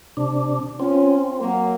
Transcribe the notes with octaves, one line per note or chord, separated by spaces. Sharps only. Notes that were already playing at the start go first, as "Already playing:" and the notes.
C3 D4
C4 C#4 F4
F#3 A#3